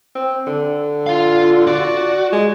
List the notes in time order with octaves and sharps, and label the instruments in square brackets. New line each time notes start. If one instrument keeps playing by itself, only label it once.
[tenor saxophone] C4
D3
[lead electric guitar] F4 F5
[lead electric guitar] F#4 [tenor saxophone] D5
[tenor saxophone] G#3